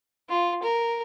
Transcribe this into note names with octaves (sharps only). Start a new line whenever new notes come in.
F4
A#4